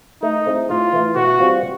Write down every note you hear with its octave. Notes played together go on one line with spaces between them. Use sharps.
A3 D#4
C4 E4 G#4
A2 F4
E3 A3
B2 F#4
G3 C4 F4